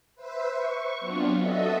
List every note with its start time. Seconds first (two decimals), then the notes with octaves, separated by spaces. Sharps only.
0.15 B4 C5 E5
0.51 C#6
0.99 F#3 B3 C4 D4 F4
1.38 F#4 A4 D#5 E5